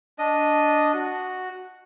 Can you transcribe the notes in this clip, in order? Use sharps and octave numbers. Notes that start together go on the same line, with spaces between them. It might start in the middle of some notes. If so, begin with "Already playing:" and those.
D4 D#5
F#4